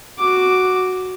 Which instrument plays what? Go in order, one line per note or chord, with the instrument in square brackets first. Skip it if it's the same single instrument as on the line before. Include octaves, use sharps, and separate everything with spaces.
[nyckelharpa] F#4 D6